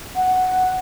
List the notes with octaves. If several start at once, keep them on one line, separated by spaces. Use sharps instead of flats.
F#5